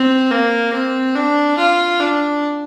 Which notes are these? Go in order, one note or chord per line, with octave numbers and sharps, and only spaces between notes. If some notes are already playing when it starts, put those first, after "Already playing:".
Already playing: C4
A#3
C4
D4
F4
D4